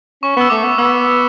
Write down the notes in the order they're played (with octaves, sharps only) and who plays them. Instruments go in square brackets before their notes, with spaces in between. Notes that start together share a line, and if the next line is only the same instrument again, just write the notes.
[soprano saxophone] C#4 [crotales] C#6
[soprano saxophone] B3 [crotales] E6
[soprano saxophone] A3 [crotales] D6
[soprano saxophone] B3
[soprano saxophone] B3 [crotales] E6